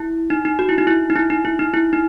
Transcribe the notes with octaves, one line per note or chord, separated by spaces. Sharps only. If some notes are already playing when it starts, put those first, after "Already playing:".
Already playing: E4
D#4
D#4
F#4
E4
D#4
E4
D#4
E4
D#4
E4
D#4
E4
D#4